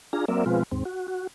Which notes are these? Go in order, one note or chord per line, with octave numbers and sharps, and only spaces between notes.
D4 F4 G#4 A#5
F#3 A#3 C4 A#4 D5 E5
B2 F3 G#3 C4 F4 B4
D#2 G#2 C4
F#4
F#4